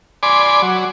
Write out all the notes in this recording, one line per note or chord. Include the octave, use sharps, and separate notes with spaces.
D5 G#5 B5 C6 D6
F#3